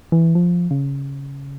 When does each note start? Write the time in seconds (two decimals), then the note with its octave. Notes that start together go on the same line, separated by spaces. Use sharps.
0.12 E3
0.35 F3
0.71 C#3